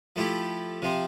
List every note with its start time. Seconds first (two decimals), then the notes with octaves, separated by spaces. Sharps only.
0.16 F3 A3 E4 G4
0.82 C3 F3 C4